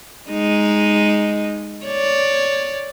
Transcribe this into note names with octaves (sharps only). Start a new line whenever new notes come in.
G#3 D#4
C#5 D5